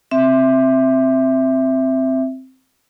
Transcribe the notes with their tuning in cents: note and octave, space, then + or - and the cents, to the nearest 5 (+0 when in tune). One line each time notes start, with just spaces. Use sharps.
C4 +0 E5 +0